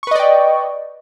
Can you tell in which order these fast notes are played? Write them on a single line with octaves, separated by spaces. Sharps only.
C#6 B4 D#5 D5 G5